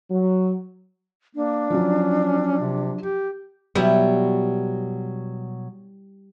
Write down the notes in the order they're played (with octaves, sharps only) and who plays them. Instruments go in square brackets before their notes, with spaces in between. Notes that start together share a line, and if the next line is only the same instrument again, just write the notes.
[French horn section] F#3
[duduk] A#3 [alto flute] D4
[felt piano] F3 F#3 [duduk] C#4
[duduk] C3
G4
[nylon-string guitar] B2 F#3 B3 [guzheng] G3 E4